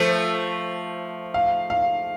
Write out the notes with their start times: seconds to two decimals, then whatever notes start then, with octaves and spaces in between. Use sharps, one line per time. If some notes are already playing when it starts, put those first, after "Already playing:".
Already playing: F3 A3 C5
1.34 F5
1.70 F5